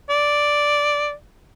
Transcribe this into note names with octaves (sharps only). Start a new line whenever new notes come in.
D5